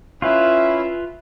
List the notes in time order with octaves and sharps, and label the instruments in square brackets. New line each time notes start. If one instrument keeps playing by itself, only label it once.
[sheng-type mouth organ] C#4 E4 [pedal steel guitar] F4 B4 [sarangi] E5